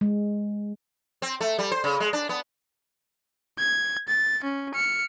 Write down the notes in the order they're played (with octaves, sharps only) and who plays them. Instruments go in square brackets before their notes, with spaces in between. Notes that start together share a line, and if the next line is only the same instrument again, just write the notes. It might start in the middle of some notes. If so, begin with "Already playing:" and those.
[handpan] G#3
[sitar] C4
A3
G3
C5
C#3
G#3
D4
B3
[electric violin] G#6
A6
C#4
F6 C#7